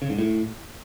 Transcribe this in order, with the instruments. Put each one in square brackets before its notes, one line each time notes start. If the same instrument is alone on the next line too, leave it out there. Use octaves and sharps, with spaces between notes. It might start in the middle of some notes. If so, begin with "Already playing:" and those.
[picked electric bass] C#3
G#2
A2